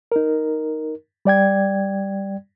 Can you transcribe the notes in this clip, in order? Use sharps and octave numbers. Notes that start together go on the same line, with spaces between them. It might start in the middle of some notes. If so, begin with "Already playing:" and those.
D#4 A#4
G3 D5 G5 G#6